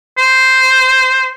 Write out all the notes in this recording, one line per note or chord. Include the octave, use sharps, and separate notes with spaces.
C5